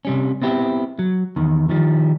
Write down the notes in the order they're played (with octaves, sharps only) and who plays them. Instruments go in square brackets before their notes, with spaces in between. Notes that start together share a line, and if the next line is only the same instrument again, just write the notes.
[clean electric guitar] C3 G3 C#4
B3 C4 E4 G4
F#3
E2 D#3
D#3 F3 G3